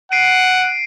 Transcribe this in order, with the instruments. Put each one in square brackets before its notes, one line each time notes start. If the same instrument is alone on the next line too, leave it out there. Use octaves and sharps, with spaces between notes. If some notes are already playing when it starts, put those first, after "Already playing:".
[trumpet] F#5 [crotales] C7 D7 D#7